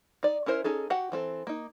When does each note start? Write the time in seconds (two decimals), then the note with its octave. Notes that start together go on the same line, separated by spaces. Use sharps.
0.23 D#4 D5
0.46 C#4 E4 A#4 C5
0.64 C#4 D#4 G#4 A4
0.90 F#4 G4 F#5
1.12 E3 C4 A4
1.47 A#3 D#4